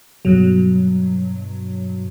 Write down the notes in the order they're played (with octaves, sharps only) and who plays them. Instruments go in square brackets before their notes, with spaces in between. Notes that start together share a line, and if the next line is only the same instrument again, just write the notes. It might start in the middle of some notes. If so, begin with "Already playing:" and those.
[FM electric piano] G2 B2 F#3